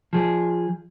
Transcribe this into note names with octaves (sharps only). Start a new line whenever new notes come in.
F3 G#4